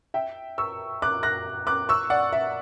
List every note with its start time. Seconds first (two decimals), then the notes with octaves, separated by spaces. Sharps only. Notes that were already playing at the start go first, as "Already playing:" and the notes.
0.14 E5 G5
0.58 C#6 E6
1.02 D6 F#6
1.23 F#6 A#6
1.67 D6 F#6
1.89 C#6 E6
2.10 D5 F#5
2.33 E5